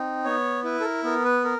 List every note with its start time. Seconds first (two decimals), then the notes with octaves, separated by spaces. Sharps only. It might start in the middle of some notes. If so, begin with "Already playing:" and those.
Already playing: C4 D#4
0.24 B3 C#5
0.64 E4 B4
0.80 A4
0.84 A#4
1.04 B3 A#4
1.25 B4
1.44 A#4